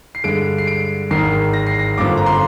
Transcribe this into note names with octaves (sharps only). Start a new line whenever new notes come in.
C7
G2 D3 G#3 D7
C7
D7
G#1 G#2 D#3 G#3 C7
A#6
C7
A#6
G1 F2 D3 F3 A#3 D6
A#5
C6